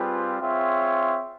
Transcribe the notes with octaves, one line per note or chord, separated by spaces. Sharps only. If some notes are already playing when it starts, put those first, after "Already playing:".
Already playing: G3 C4 F4 G#4 B4
C4 F4 G#4 C#5 E5